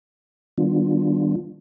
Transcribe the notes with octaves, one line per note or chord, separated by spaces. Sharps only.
D#3 G3 B3 D4 F4